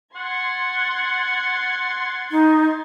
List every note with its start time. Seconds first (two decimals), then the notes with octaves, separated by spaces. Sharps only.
0.15 F#5 C6 G#6 A6
2.31 D#4